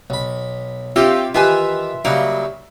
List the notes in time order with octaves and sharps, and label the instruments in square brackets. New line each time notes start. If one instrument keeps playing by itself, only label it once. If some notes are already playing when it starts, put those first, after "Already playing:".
[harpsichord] B1 B5
[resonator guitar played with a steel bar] C4 C#5 [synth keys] F4 G4 [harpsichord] E5 F5
[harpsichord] D#3 E3 G4 [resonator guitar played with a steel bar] F4 B4 G#5 [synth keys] E5
[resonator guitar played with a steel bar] C#3 F#3 A#3 [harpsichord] G3 D#4 E4